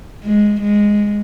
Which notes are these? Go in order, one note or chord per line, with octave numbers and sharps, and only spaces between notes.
G#3
G#3